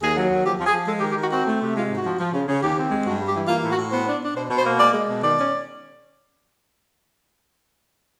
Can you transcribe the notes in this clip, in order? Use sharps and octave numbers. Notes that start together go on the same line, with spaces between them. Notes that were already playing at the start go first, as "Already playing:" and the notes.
D#2 G#4
F#3
D#2
F3 G4
F3
G#4
F3
G#3 A4
G4
D#3
G4
D#3 F#4
C4 F#4
A3
C3
G#3 F4
G#2
F#4
F3
F3
C#3
C#3
D#2 G4
C4
G#3
G2 F#4
G3
G4
E3
A#3 F4
A2
F#4
A2
B3 C5
D4
D4
B2 C5
B2
C5
A#3
G#3 D5
G#3
B2
D#3 D5
C#4